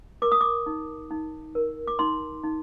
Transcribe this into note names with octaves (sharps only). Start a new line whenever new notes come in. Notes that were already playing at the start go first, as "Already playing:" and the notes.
A#4 D6
D#6
D6
D#4
D#4
A#4
D6
D#4 C6
D#4